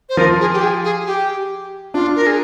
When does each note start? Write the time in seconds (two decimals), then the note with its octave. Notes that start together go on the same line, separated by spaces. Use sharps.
0.09 C5
0.17 F3 F4 A#4
0.40 G#4
0.53 G4
0.62 G#4
0.84 G#4
1.07 G4
1.94 D4 F4
2.16 A#4
2.27 G#4